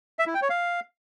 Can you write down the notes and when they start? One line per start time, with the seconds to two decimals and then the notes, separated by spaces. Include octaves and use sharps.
0.19 E5
0.27 E4
0.34 G5
0.42 C#5
0.50 F5